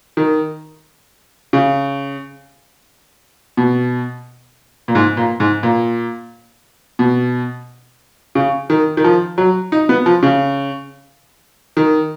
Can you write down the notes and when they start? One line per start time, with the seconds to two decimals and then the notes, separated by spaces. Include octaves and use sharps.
0.17 D#3
1.53 C#3
3.57 B2
4.88 A#2
4.95 G#2
5.17 A#2
5.40 G#2
5.63 A#2
6.99 B2
8.35 C#3
8.70 D#3
8.97 D#3
9.04 F3
9.38 F#3
9.72 D#4
9.89 B3
10.06 F3
10.23 C#3
11.77 D#3